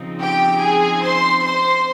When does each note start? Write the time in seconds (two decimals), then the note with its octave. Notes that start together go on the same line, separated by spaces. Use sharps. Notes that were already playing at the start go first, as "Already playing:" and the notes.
Already playing: C#3 F3 C4 D#4
0.20 G4 G5
0.62 G#4 G#5
1.03 C5 C6
1.44 C5 C6